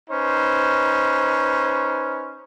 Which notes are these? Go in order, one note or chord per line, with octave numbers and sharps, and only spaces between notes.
C#4 D#4 B4 C5